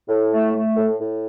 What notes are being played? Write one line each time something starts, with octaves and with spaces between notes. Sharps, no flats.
A2
A3
A3
A2
A2